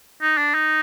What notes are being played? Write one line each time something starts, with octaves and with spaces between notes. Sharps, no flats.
D#4
D4
D#4